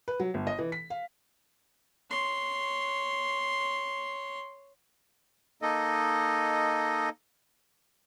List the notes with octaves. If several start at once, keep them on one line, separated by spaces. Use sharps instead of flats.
B4
F#3
G1
D#5
E3
B6
F5
C#5 C6
A#3 D#4 A4 D#5